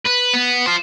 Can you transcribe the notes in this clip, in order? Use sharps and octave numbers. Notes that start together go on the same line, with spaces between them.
B4
B3
F4 C5